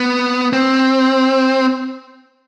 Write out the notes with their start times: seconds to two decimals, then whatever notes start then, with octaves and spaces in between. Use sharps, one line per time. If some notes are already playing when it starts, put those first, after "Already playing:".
Already playing: B3
0.53 C4